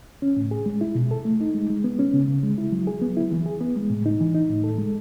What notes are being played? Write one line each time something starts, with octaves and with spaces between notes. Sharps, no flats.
C#4
A2
G#4
G#3
E4
B2
A4
A3
D#4
G#3
G#3
B3
C#4
C#3
C#3
G#3
E4
F#3
G#4
B3
E4
E3
G#4
B3
G#3
A2
D#4
E3
D#4
A2
A4
G#3